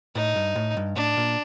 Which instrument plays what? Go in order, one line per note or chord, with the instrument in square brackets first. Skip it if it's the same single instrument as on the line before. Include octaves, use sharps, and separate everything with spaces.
[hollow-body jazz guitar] A2 [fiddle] D#4
[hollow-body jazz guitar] G2
A2
G2
[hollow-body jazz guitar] A2 [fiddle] D4
[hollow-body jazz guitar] A#2